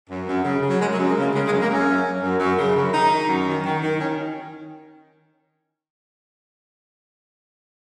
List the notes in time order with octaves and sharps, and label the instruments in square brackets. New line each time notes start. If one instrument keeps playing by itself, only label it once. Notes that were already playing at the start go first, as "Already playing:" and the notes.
[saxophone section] F#2
F#2
C#3
C#3
F#3
F#2 G#3
F#3
F#2
G#3
C#3 A#3
C#3 G#3
G#3
F#2
A#3
F#2 C#4
F#2
F#2
F#2
F#2
C#3
F#2
D#3 D#4
D#3
F#2
D#3
D#3
D#3
D#3 C#4